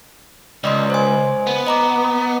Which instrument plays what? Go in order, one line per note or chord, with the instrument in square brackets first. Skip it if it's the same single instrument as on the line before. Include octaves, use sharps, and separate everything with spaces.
[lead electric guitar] C#2 [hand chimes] D5 D#5 C6
[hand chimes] C5 G#5
[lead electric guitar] B3
[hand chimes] D#5 A#5 D6